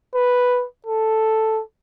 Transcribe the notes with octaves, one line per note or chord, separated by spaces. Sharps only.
B4
A4